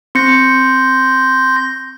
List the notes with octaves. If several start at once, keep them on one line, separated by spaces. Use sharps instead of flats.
C4 C6 G6 A#6 C#7